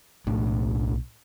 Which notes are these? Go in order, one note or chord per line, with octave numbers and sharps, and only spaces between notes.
B1 A2 A3 D4